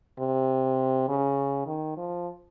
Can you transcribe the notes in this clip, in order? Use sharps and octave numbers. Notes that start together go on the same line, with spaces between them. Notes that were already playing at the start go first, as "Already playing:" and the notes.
C3
C#3
D#3
F3